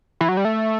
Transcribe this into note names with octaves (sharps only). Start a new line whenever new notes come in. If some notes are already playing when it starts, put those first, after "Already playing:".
E3
F#3
G3
A3